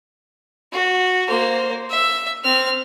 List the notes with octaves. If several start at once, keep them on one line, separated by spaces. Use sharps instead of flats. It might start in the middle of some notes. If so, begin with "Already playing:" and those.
F#4
A#3 C5
E5
C4 F6